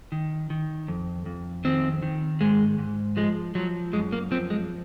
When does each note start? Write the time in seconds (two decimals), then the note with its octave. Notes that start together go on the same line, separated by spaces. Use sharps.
0.12 D#3
0.50 D#3
0.88 F2
1.26 F2
1.65 D#3 C4
2.02 D#3
2.41 G#2 G#3
2.78 G#2
3.17 F3 G#3
3.55 F3 F#3
3.93 F#2 G#3
4.12 A#3
4.31 F3 C4
4.50 G#3